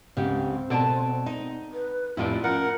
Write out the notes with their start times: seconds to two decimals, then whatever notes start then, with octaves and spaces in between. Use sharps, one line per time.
0.17 C#2 G#2 C#3 C4 G4
0.70 B2 A4 C5 D5 A5
1.26 D#4
1.73 B4
2.17 F2 A2 E4 F4 G4 D5 D#5
2.44 F3 C#4 A#4 F#5